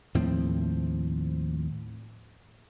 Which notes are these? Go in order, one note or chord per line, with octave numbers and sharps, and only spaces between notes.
D#2 A2 F3 C4